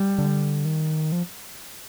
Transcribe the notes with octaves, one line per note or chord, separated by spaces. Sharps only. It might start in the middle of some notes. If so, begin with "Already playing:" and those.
Already playing: G3
D3
D#3
F3